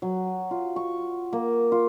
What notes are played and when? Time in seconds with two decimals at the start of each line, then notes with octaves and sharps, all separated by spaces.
0.02 F#3
0.51 F4
0.76 C#6
1.33 A#3
1.72 F4